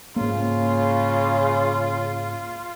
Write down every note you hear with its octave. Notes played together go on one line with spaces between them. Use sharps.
G#2 C#3 A#3 F4